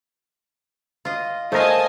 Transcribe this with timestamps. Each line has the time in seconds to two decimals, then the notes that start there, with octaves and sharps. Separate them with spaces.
1.05 F4 D#5
1.52 A3 A#4 C5 D#5 F5 G#5 A5 A#6